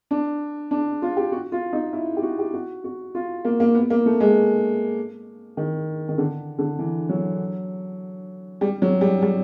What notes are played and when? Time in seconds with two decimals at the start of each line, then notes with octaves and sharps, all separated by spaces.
0.11 D4
0.71 D4
1.02 F4
1.17 G4
1.32 F#4
1.52 F4
1.73 D#4
1.93 E4
2.17 G4
2.23 F#4
2.39 G4
2.54 F#4
2.84 F#4
3.15 F4
3.45 A#3
3.60 A#3
3.75 B3
3.90 A#3
4.06 A3
4.20 G#3
5.57 D#3
6.09 D#3
6.18 D3
6.59 D3
6.79 E3
7.09 F#3
8.61 G3
8.82 F#3
9.01 G3
9.22 G3